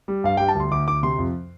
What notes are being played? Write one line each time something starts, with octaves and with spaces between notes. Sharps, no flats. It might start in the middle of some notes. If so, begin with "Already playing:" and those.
G3
G2 F5
G3 G5
A5
D2 C6
D2 D6
D2 D6
C3 C6
F2